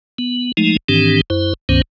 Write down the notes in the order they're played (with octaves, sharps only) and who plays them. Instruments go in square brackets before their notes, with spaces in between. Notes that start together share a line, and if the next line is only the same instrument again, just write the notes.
[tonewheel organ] B3
F3 G#3 A3 D#4
G#2 D#3 E3 C4 D4 G4
F#2 E4 C5
C#2 G2 D#3 B3 C#4 C5